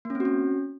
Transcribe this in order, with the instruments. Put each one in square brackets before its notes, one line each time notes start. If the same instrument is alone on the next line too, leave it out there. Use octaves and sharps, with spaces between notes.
[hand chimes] A#3
C#4
C4
F#4
C#4